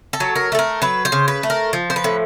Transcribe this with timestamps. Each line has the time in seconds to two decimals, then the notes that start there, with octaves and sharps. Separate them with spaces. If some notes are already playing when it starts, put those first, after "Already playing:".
0.13 A4
0.20 F#3
0.36 A#4
0.52 A3 A4
0.59 A#4
0.82 F#3 B4
1.05 C5
1.12 C#3
1.28 B4
1.43 A3
1.50 A#4
1.73 F3
1.90 C5
1.96 B4
2.04 A2